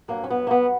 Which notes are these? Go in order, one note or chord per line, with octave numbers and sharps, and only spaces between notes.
G2 F#3 A#3
C#4
B3
A#3
B3